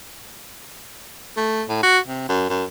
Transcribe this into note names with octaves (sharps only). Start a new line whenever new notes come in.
A3
A2
F#4
C3
F#2
F#2